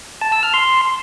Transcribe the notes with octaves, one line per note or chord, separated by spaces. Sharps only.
A5
E6
F6
C6